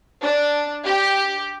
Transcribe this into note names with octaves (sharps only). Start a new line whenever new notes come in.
D4
G4